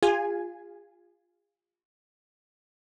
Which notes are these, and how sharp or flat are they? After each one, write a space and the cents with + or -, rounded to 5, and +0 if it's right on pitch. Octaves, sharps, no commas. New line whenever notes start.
F4 +0 G#4 -40 G#5 +0